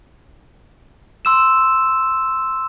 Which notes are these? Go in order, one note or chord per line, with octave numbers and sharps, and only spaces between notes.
C6 E6 E7